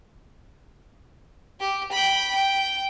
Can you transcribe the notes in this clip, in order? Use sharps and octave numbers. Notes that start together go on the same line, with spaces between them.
G4
G5 B5
G5